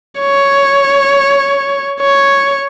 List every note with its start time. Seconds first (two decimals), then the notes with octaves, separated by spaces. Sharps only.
0.20 C#5
2.01 C#5